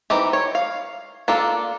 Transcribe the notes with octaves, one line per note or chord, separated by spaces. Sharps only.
D#3 E3 C4 G4
C#5
F5
A#3 D4 F4 A4